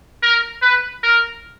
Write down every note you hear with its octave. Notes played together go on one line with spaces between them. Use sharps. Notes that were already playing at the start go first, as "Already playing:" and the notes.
A#4
B4
A#4